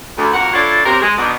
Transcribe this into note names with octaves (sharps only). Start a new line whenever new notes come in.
D2
F2 A#3 F#4 A#4 F#5
D4 E4 F4 A4 C#5 D5
C3 F#3 C4 G4 A#4
G#3
B2 D#3 D4